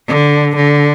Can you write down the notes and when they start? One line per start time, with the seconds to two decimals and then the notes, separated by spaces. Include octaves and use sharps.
0.08 D3
0.56 D3